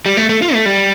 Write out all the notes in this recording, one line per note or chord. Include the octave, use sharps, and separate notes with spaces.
G3
A3
A3
F4
A3
G3